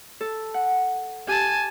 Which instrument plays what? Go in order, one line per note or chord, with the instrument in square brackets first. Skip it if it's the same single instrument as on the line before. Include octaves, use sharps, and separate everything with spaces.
[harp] A4
F#5
[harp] G4 [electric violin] G#5 A5